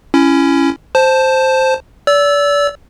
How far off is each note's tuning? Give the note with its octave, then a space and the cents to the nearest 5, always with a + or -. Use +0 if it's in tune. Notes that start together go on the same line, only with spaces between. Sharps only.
C#4 +0 E4 +25
C5 +0 A5 +0
D5 -35 E6 +0